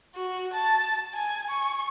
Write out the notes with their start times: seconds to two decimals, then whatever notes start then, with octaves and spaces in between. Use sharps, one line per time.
0.15 F#4
0.53 A5
1.15 G#5
1.50 C#6